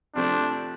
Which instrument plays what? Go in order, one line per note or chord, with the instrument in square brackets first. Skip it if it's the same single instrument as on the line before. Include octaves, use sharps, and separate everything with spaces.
[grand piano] C3 F3 A3 C4 [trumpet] D4